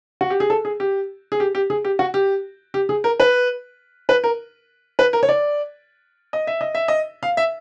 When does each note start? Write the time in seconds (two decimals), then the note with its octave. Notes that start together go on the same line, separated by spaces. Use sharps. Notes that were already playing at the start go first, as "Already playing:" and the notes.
0.21 F#4
0.30 G4
0.40 G#4
0.50 A4
0.65 G#4
0.80 G4
1.32 G#4
1.40 G4
1.55 G4
1.70 G#4
1.84 G4
1.99 F#4
2.14 G4
2.74 G4
2.89 G#4
3.04 A#4
3.20 B4
4.09 B4
4.24 A#4
4.99 B4
5.13 A#4
5.23 C#5
5.29 D5
6.33 D#5
6.47 E5
6.61 D#5
6.75 E5
6.88 D#5
7.23 F5
7.37 E5